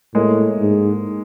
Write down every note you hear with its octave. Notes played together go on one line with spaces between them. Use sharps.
A2 G#3 A#3
G#2